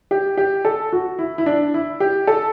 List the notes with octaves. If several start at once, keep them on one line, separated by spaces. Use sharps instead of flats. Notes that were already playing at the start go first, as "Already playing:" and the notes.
G4
G4
A4
F#4
E4
E4
D4
E4
G4
A4